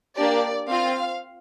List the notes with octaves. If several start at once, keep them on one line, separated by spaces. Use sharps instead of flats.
A#3 D4 G4 D5
C4 F4 F5